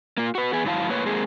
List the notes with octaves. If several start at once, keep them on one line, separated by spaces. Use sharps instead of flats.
A#3 F4
F#4 B4
B3 G#4
G#2 F#3 E4 F5 A5
A2 A#3 B4 C#5
G#3 A#3 C4 G#4